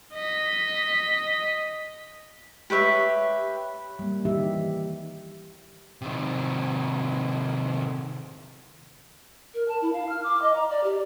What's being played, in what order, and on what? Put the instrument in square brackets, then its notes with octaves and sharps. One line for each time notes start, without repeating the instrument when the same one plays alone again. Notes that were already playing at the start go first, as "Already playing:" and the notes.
[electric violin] D#5 B6
[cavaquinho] G4 B4 C#5 E5
[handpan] G3 A#3
D#3 E3 D#4 G4 E5
[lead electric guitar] C3 D#3
[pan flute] A#4
A5
E4
F5
F6
D6
D#5
A#5
D5
G4